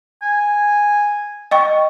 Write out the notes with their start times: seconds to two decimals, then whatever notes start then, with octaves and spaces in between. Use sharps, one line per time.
0.23 G#5
1.51 D#5 G5 C#6